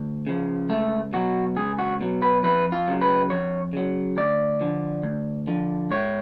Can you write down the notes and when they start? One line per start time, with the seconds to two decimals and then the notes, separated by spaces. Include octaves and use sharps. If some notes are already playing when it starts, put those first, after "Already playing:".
Already playing: D2
0.27 C#3 F3
0.69 C#2 A3
1.13 B2 F#3 F#4
1.56 C#2 G#4
1.79 F#4
2.01 B2 F#3
2.22 B4
2.43 F2 B4
2.72 F4
2.87 C#3 F#3
3.01 B4
3.30 F2 C#5
3.73 C#3 F#3
4.17 D2 D5
4.61 D3 F3
5.03 D2
5.47 D3 F3
5.91 G#2 C#5